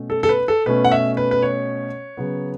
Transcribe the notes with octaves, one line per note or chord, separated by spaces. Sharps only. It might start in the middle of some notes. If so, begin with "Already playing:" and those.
Already playing: B2 A3 C#4
A4
A4
B4
A4
B2 A3 C#4 B4
F#5
E5
B4
B4
C#5
C#3 F#3 B3